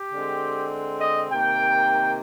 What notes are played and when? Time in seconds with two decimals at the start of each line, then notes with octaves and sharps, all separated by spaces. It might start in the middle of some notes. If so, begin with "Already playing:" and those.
Already playing: G4
0.13 D3 G#3 C4
1.01 D#5
1.30 C3 D#3 A#3 G5